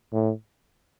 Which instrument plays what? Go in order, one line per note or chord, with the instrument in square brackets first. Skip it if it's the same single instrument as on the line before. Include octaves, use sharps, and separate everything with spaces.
[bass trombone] A2